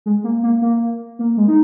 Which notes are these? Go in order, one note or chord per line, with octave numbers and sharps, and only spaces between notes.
G#3
A#3
A#3
A#3
A#3
G#3
D#4